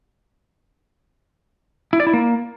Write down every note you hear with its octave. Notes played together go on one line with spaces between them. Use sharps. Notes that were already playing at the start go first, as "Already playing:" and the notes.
E4
D5
E4
A#3